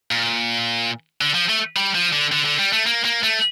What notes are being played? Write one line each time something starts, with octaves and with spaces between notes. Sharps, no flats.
A#2
D3
F3
A3
G3
F3
D3
D3
D3
G3
A3
A#3
A#3
A3